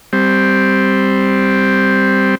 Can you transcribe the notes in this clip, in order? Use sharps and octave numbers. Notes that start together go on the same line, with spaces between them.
G3 C4